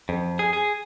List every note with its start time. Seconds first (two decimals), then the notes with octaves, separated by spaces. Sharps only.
0.09 F2
0.39 G#4
0.53 G#4